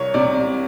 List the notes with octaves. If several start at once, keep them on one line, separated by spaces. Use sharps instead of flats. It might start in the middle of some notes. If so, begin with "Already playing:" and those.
Already playing: C2 C#5
C3 D5